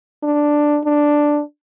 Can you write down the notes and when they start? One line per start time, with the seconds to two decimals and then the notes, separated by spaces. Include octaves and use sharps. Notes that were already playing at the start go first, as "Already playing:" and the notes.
0.23 D4
0.85 D4